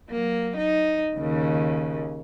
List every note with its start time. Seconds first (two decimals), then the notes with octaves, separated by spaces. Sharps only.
0.10 F#3 A#3
0.57 D#4
1.16 D#2 C#3